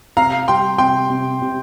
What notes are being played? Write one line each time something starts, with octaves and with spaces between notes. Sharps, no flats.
C3 F5 A#5
G3 G5 C6
C3 G5 C6
C3
C3